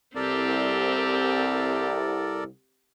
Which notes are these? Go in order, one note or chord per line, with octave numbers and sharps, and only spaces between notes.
C2 C4 G4 A4 A#4 D5